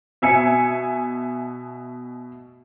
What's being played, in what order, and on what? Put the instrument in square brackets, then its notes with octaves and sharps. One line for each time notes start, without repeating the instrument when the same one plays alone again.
[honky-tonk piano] B2 E5 G#5 C#7